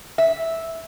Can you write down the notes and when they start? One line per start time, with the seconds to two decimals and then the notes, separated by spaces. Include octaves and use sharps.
0.18 E5